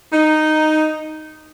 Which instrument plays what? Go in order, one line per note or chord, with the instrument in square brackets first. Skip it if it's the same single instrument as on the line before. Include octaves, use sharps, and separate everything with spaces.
[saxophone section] D#4